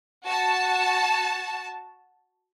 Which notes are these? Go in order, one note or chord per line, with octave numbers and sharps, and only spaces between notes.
F#4 A5